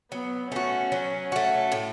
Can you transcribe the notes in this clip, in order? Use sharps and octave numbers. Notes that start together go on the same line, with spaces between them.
F#3 B3
A3 C#4 F#4
F#3
A3 F#4
A2